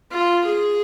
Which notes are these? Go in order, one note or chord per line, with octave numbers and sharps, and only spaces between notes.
F4
G#4